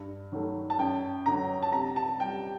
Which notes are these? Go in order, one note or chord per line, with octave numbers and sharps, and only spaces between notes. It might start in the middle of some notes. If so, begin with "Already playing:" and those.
Already playing: G2
D#3 F#3 A3
A5
F#2 G5
D3 F#3 A#5
A5
C3 A#5
A5
G3 G5